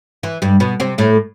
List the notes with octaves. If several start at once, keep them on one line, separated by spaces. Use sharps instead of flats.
E3
G2 G3
B2 B3
C3 C4
A2 A3